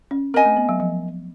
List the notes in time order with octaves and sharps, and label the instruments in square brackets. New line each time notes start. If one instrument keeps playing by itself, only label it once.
[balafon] C#4
[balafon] C4 [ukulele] A#4 D#5 G#5
[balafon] A3
B3
F#3
F3